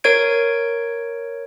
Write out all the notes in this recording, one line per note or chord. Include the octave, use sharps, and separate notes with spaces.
A#4 C#5 G#6 D7